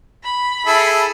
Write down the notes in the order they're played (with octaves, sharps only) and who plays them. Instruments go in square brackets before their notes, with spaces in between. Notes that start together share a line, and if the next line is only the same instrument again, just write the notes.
[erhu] B5
[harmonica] E4 G#4 A4